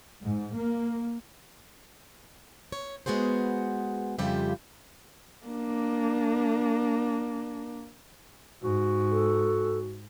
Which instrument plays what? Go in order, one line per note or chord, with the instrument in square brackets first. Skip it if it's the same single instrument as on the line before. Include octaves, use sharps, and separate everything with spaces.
[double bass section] G#2
A#3
[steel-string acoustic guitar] C#5
G#3 B3 F#4 G#4 C5
F2 C#3 G3 F4 G4 E5
[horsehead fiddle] A#3 D4
[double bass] G#2 [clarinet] F#4
[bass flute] A4